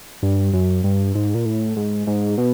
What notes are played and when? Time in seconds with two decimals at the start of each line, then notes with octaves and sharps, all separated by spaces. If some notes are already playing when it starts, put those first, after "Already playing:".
0.23 G2
0.53 F#2
0.84 G2
1.15 G#2
1.35 A#2
1.45 A2
1.76 G#2
2.07 G#2
2.38 B2